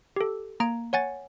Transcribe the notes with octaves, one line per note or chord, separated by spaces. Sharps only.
G4 A4
A#3 A#5 G#6 D7
C#5 F#5 G#5 A6